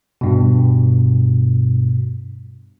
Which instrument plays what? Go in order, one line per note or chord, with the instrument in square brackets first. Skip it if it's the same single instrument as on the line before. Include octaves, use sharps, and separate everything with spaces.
[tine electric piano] G2 B2